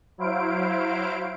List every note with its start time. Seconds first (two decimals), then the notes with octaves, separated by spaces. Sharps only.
0.18 F#3 E4 C5 F5 D7